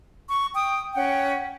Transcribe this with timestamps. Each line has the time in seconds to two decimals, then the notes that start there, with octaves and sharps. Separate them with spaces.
0.30 C#6
0.55 G5 D#6
0.94 C#4 F#5 G5